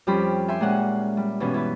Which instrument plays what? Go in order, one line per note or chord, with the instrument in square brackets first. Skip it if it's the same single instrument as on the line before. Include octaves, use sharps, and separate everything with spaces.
[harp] F2 G3 C#4 G4 C5 B5
E5 G5 G#5 C6
A#2 G#3 C#4 F#5
G3
G2 B2 E3 B3 C#4
E4 B4